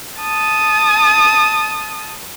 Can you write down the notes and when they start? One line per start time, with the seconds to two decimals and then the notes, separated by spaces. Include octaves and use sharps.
0.21 A5 D#6